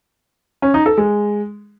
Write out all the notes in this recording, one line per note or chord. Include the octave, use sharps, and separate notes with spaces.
C#4
D#4
A4
G#3